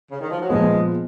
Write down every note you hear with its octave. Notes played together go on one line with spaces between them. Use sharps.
C#3
D#3
F3
F#3
A#2 F3 G#3 B3